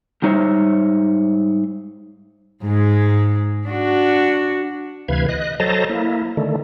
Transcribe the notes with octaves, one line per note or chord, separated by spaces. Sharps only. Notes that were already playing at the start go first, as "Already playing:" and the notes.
G#2 G3 D#4 C5 C#5 E5
G#2 G#3
D4 F#4
D2 C3 E3 B4 F5 G#6
D#5 F#6
F#3 A4 C5 D#5 A5 A#5
A#3 E4
D3 D#3 A3